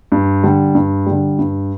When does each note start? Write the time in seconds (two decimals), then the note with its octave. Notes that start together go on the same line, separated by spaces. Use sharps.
0.12 G2
0.43 D3 G3
0.75 G2
1.06 D3 G3
1.39 G2